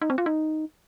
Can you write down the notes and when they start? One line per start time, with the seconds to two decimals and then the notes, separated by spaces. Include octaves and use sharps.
0.02 D#4
0.10 C4
0.18 F4
0.26 D#4